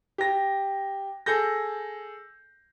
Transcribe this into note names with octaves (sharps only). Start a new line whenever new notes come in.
G4 A#6
G#4 A4 G6 A#6